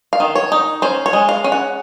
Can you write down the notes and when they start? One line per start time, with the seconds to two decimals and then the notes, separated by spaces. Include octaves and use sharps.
0.13 F5
0.20 D#3
0.35 C#5
0.52 D#4
0.82 C#4 C5
1.06 C#5
1.13 G#3
1.29 F5
1.44 C#4
1.52 F#5